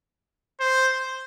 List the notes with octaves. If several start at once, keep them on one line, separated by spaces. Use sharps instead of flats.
C5